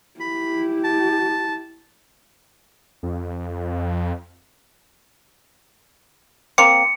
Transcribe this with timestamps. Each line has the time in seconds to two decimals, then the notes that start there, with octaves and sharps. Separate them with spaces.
0.20 E4 G4 B5
0.84 A5
3.03 F2
6.58 A#3 C4 C#7